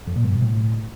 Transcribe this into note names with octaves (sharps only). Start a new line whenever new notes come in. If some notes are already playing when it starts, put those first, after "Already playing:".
F2
A#2
G2
B2
A2